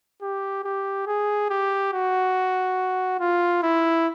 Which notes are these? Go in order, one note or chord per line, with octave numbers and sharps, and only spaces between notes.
G4
G4
G#4
G4
F#4
F4
E4